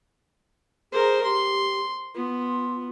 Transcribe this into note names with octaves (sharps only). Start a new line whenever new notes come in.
G#4 A#4 C5
G4 C6
B3 F4